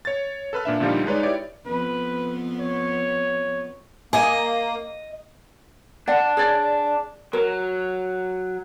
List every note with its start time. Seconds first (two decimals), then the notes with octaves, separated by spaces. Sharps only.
0.05 C#5 A6
0.53 A4 B4 B5 F6
0.65 A#2 D4 E5
0.80 A#2 D3 F3 G3 D#4 F4
1.06 G#3 D#4 B4 C#5 D5
1.23 E4 G4 C#5 D5
1.66 F2 B3 B4
2.59 C#5
4.13 A#3 D5 D#5 G#5
6.08 D4 D5 F#5
6.37 G#4 C#5 D5
7.33 F#3 A#4